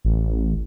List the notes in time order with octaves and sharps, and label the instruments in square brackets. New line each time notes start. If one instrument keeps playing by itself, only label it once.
[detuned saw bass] A1